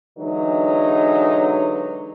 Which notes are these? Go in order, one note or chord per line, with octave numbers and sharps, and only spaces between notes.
D3 E3 F#3 G#3 D#4